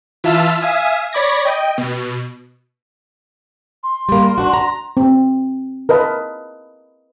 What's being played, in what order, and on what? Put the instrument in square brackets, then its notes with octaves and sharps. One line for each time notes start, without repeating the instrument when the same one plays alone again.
[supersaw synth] E3 F4 E5 A5 E6 F6
E5 F5 G#5 D#6
C#5 D5 B5 D6 G#6 A#6
D#5 G5
B2
[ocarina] C6
[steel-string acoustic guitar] G3 A#3
D4 F#4
A#5
[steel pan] C4
A#4 B4 D#5 A5